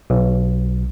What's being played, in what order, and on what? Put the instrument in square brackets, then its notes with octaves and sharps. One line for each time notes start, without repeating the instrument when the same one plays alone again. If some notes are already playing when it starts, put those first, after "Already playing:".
[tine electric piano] B1